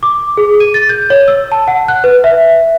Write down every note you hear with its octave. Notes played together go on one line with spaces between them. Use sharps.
D6
G#4
D#7
A6
G6
C#5
E6
A5
F#5
F#6
B4
E5